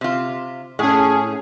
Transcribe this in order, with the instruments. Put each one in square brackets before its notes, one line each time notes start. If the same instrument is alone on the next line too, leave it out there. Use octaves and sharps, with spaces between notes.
[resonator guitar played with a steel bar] C3 F4
[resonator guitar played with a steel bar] A2 [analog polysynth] C#4 G#4